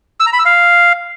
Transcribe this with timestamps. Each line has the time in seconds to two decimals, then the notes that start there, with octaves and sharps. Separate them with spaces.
0.20 E6
0.26 A#5
0.33 B5
0.39 E6
0.45 F5